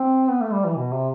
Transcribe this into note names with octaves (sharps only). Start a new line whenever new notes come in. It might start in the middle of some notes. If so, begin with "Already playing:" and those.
Already playing: C4
B3
A3
G3
E3
B2
C3